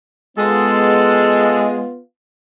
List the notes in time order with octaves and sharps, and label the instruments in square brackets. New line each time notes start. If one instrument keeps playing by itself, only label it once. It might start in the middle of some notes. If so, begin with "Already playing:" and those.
[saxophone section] G#3 [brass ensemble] B3 F4 [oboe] A4